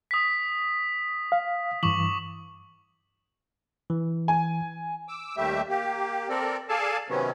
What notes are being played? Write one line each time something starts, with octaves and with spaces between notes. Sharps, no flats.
D#6 B6
F5
G2 E3 C#6 D6 F#7
E3
G#5
D6 E6
D#2 G3 A3 G4 E5
A#3 G4
C4 A4 A#4 D5
G#4 A4 D5 F5 G#5 A5
C3 D#3 F#3 B3 C#4